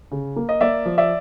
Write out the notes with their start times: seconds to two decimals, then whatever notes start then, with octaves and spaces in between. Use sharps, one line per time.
0.11 C#3
0.36 A#3
0.49 D#5
0.61 A#3 D5 E5
0.85 F3
0.98 D5 E5